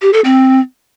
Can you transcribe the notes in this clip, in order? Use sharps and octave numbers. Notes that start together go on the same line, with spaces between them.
G4
A4
C4